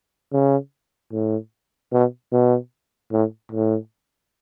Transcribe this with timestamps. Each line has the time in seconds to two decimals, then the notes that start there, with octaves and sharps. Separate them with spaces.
0.33 C#3
1.13 A2
1.92 B2
2.32 B2
3.12 A2
3.52 A2